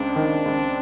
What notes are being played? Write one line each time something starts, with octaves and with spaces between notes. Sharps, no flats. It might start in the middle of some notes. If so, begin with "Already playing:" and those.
Already playing: C#2 C4 D4
D#3
C#2